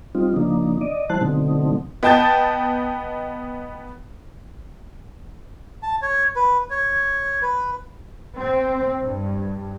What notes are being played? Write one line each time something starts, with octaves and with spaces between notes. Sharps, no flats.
G3 C4 D#4 F4
C#3 F3 A#3 D4 D#4
D5 D#5
E3 G3 E4 C5 A5 F#6
B2 D3 F#3 A3 C4 D#4
B3 D#5 G5 A5 G6 A6
A5
C#5
B4
C#5
B4
C4
G2